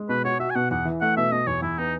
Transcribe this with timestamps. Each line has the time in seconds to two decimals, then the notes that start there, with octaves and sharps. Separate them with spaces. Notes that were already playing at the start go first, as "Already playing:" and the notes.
Already playing: G#3
0.09 B2 B4
0.25 F#4 C#5
0.40 F#4 E5
0.50 G#5
0.55 B2 F#5
0.71 E2 F#5
0.85 E3
1.01 A3 F#5
1.17 B2 E5
1.32 B2 D#5
1.47 E2 C#5
1.62 E2 E4
1.78 B3 D#4